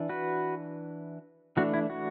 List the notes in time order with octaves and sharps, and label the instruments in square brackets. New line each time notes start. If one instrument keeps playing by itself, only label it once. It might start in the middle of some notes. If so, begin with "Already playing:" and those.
Already playing: [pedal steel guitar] E3 D4
F#4 B4
E3 A3 D4 F#4
E4
F#4